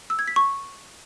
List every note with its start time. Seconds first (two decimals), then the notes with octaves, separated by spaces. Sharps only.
0.10 E6
0.19 G#6
0.28 B6
0.36 C#6